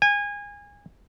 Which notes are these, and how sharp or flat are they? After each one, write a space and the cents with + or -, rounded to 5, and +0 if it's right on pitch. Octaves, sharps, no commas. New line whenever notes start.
G#5 -25